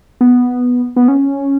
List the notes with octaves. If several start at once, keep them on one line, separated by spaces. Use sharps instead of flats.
B3
B3
C#4